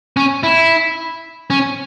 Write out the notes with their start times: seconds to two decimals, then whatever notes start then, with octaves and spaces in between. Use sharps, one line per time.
0.17 C#4
0.43 E4
1.50 C#4